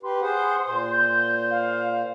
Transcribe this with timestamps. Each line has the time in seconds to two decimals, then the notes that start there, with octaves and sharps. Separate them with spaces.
0.03 G4 B4 C6
0.22 G#4 C5 F#5
0.67 A#2 C5
0.92 G6
1.50 F5